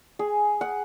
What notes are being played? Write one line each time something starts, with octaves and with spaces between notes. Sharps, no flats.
G#4
F#5